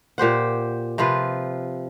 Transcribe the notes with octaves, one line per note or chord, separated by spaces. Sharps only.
A#2 G4 C5 F#5
C3 F3 F4 B4